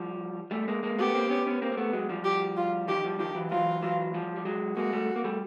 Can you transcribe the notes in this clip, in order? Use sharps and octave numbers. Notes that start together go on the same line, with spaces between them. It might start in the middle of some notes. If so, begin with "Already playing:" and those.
Already playing: F3 G3
G3 A3
G#3 A#3
G#3 A#3
A3 B3 G4
A#3 C4
B3 C#4
B3 C#4
A#3 C4
A#3
A3 B3
F#3 G#3
F3 G3
G4
F4
D#3 F3 G4
F3 G3
D#3 F3 G4
E3 F#3
E3 F#3 F4
E3 F#3
F3 G3
G3
F#3 G#3
G#3 A#3 F#4
G3 A3
A#3
G3 A3